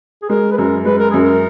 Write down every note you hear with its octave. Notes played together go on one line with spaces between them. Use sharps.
G#4
G#3 A#4
B4
F#2 A#4
G#3 B4
A#4
F#2 G#4
A#4